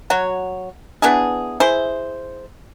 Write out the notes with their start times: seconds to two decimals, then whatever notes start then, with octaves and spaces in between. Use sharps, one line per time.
0.10 F#3 F#4 C#5
1.02 B3 D4 E4 G#4
1.60 E4 G#4 C5